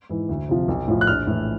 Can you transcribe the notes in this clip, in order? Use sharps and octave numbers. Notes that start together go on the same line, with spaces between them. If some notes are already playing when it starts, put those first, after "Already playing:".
G#2 E3
D2
C3 F3
B1
A2 F3
F#6
A#1 F6
A2 E3